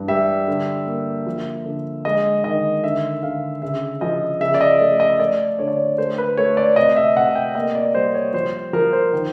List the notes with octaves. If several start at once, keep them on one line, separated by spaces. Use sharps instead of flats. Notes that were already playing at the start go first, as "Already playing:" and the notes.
Already playing: G2 E3
G3 E5
D3
A#3
F3
D3
G#3 D#5
D#3 D#5
D3 E5
D3 F5
C#3 E5
F3 D#5
C#3 E5
D5
D#5
A3
D#5
A3 D5
D3 C#5
D5
C#5
A3 C5
B4
A3 C#5
D5
C3 D#5
E5
C3 F#5
G5
A#3 D#5
D5
G3 C5
C#5
F3 C5
F3 A#4
C5
D#3